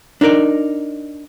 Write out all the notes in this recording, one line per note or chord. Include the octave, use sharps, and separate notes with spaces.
D4 D#4 A#4 D5